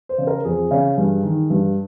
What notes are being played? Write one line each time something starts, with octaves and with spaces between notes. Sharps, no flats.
C5
C#3
A#4
F2 G#4
C#3
G2
D#3
G2